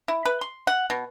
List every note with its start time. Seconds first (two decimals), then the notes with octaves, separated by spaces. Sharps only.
0.08 E4
0.25 B4
0.41 C6
0.67 F#5
0.90 B2